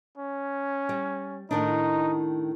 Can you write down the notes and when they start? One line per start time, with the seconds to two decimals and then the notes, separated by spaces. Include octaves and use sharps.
0.18 C#4
0.89 G3
1.51 A2 D#3 D4 D#4